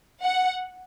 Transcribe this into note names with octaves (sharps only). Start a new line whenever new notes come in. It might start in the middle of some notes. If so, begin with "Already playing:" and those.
F#5